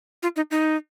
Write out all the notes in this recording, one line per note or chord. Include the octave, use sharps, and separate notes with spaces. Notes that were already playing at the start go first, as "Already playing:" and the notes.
F4
D#4
D#4